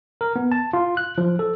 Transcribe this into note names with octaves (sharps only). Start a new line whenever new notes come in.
A#4
B3
A5
F4
F#6
F3
A4